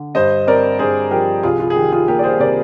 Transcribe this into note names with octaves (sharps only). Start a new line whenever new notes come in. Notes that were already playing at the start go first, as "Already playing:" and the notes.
Already playing: D3
G2 C5 D#5
C4 A#4 D5
G2 G#4 C5
F3 G4 A#4
C2 F4 G#4
F4
G#4
D#3 G4
F4 G#4
A#3 G4 A#4
D5
G#4 C5
C3 A#4 D5